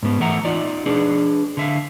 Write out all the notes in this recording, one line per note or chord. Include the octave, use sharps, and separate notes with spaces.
G#2 B3
E3 A3 E5 F#5 A#5
D#4 F4 D5
D4 G#4 B4 D5
D3 E5 F5